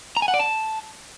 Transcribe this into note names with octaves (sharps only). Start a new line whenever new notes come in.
A#5
G#5
F#5
D5
A5